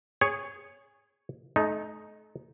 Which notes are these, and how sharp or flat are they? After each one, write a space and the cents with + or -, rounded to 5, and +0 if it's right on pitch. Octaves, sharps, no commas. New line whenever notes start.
G#4 -15 C#5 +0
A3 -40 D#4 +0